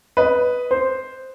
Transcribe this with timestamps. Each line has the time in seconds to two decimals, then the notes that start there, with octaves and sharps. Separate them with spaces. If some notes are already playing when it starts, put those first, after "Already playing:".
0.17 B4 D#5
0.71 C5